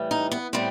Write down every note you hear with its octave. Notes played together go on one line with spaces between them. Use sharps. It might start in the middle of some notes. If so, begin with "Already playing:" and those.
Already playing: A2 E3 G3
D#4
B3
A2 G3 B3 C4